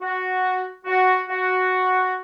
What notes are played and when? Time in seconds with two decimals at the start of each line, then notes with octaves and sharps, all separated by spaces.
0.01 F#4
0.86 F#4
1.28 F#4